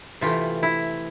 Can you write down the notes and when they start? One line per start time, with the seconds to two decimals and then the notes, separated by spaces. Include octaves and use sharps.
0.21 C3 E3 A3 F4
0.63 E4